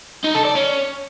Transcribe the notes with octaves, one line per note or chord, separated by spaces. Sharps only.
D#4
A4
D5
C#4